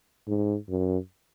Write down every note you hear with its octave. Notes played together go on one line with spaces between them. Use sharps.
G#2
F#2